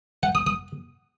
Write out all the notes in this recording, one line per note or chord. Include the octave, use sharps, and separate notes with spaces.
F#5
D#6
D#6